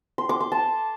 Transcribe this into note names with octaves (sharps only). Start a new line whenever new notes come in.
C6
D6
C6
A5